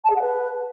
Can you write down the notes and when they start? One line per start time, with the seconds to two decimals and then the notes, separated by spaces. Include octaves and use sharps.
0.04 A5
0.10 G#4
0.15 F#5
0.21 B4